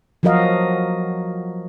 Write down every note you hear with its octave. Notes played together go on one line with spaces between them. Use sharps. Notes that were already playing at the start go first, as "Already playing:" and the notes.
F3 F#3 F#4 A#4 D#5 F5